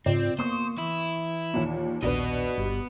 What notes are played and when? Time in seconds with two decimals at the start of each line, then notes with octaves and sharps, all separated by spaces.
0.06 G#2 C#3 C4 F4 D5
0.39 A#3 B3 C5 C#6 D#6
0.78 E3 E4
1.54 D#2 A#2
2.02 A#1 D#2 B2 B3 D4 B4 D#5
2.57 G1 G4